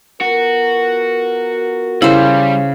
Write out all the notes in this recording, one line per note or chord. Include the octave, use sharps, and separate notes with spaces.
B3 F4 F#4 A#4
C#3 G3 E4 C5